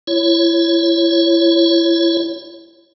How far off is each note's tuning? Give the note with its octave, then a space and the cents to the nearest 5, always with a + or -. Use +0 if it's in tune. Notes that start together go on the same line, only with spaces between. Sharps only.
E4 +30 C#5 +0